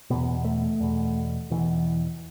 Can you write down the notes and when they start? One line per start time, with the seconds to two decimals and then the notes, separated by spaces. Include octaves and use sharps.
0.10 E2 B2 B3
0.45 A3
0.80 E2 B2
1.50 E2 B2 E3